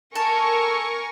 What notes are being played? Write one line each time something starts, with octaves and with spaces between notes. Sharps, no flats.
A4 A#4 G#5 C#6